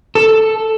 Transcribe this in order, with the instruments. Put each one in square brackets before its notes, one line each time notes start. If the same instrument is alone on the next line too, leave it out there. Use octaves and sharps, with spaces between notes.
[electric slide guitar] A4